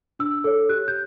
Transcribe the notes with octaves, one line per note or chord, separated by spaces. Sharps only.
D4 E6
A4 C#5
G4 F#6
G6